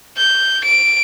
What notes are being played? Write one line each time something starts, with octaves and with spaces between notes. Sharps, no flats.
G6
D7